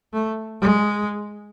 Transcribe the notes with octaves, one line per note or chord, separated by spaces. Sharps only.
A3
G#3